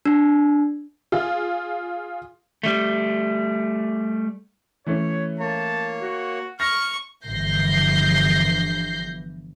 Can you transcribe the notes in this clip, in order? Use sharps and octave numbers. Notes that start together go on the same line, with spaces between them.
D4
F4 G#4
G3 A3
E3 A3 C#4 C#5
A#3 C#5 A5
F#4
C#6 F6 A#6
G1 E3 F3 G6 A#6 C7